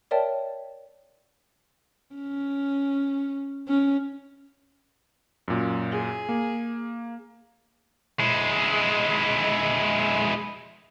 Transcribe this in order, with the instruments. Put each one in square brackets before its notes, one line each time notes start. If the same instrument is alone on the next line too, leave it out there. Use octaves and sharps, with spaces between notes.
[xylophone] A#4 C#5 D5 E5 G5 A5
[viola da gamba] C#4
C#4
[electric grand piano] F#2 A#2
[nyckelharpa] G#4
[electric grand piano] A#3
[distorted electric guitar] G#3 E4